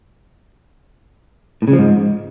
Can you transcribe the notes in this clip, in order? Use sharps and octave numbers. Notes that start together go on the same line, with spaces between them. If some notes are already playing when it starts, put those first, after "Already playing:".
A2
C#3
F3
G#2